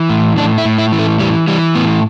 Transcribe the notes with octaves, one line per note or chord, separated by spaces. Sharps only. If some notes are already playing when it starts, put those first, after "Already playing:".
Already playing: E3
A2
A2 D4
E4
A2
E4
E3
A3
E3 G3
E3 G3
A2 B3